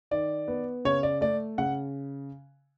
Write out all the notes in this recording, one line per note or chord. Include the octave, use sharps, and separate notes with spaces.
D#3 D5
B3
C#3 C#5
D5
A3 D5
C#3 F#5